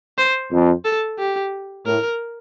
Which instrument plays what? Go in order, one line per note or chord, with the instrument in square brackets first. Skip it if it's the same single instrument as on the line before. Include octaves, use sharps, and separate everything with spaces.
[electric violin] C5
[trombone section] F2
[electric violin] A4
G4
[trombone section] A2 [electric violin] A#4